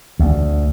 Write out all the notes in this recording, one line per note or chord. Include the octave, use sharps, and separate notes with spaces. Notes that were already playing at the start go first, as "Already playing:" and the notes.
D2